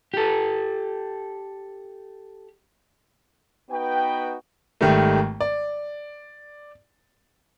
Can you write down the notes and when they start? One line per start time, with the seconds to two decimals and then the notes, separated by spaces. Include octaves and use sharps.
0.14 G4 A4
3.70 B3 D#4 F#4 B4 G5
4.81 G#1 D#3 G3 A3
5.41 D5